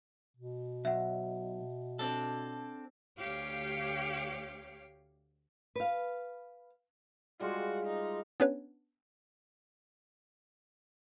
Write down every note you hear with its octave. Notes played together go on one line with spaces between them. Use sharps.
B2
B1 E5 F#5
C4 D4 A4
D2 G4 C#5 F5
B4 F5
G3 G#3 F4 F#4
D#4
B3 C#4 D4 G4 B4 C#5